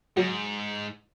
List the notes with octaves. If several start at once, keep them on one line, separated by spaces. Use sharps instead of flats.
G#2 F#3